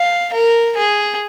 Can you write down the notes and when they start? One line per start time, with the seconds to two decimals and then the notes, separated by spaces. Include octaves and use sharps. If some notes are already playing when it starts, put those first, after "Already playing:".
Already playing: F5
0.33 A#4
0.77 G#4